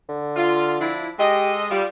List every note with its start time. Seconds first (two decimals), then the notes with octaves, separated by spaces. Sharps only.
0.09 D3
0.37 F4
0.80 F3 D4 E4
1.19 G#3 G4 A4 D#5
1.71 G3 F4